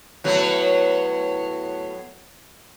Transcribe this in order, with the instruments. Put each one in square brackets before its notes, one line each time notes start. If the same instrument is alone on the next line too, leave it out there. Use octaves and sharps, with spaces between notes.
[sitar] A2 F#3 B3